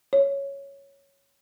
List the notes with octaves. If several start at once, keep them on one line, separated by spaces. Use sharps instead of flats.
C#5